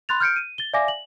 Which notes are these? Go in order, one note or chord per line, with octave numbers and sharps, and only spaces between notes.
B5 C6 F#6 A6 F7
F6 G6 C#7 D7
D#7
A6 G7
D5 E5 F5 G#5 D6 A#6
F#7